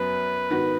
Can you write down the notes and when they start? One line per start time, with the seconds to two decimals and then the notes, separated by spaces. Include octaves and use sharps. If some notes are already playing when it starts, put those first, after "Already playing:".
Already playing: F#2 F#3 B3 B4
0.50 G#2 D#3 B3 F#4